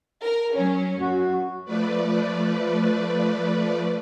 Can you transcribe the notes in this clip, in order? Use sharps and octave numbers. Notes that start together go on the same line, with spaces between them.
A#4
F#3 C#4
F#2 F#4
F3 A3 B4 D5